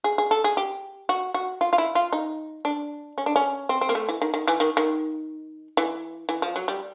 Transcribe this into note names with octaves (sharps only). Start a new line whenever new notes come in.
G#4
G#4
A4
G#4
G4
F#4
F#4
F4
F4
E4
F4
D#4
D4
C#4
D4
C#4
C4
C4
A#3
A3
E3
D#3
D#3
E3
D#3
D#3
E3
E3
F3
F#3
G3